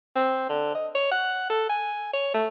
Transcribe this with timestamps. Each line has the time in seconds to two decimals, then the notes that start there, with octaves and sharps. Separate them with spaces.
0.16 C4
0.49 D3
0.75 D#5
0.95 C#5
1.11 F#5
1.50 A4
1.69 G#5
2.13 C#5
2.34 A3